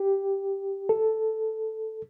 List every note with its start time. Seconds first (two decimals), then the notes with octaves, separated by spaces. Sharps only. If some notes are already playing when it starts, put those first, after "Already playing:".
Already playing: G4
0.89 A4